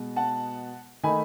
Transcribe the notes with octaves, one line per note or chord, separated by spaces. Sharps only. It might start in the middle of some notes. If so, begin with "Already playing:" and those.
Already playing: B2 G#3
F#5 A5
D#3 A3 D#4 G#5 B5